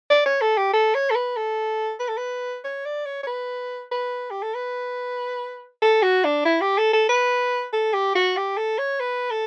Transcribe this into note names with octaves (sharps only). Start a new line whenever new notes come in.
D5
C#5
A4
G4
A4
C#5
A4
B4
A4
B4
A4
B4
C#5
D5
C#5
C#5
B4
B4
G4
A4
B4
A4
F#4
D4
E4
G4
A4
A4
B4
A4
G4
F#4
G4
A4
C#5
B4
A4